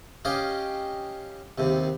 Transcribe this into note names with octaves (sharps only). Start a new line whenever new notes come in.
C#4 G4 D#5 F5 G5
D#2 C3